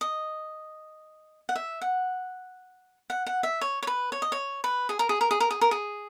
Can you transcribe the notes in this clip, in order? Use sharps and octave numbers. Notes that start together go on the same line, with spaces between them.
D#5
F#5
E5
F#5
F#5
F#5
E5
C#5
C#5
B4
C#5
D#5
C#5
B4
G#4
A#4
G#4
A#4
G#4
A#4
G#4
A#4
G#4